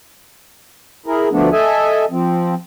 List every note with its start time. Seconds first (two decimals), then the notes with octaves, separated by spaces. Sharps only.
1.06 E4 G#4 A#4
1.32 D2 F3 A3 B3 D4
1.52 A4 D#5 E5 G#5
2.11 F3 C4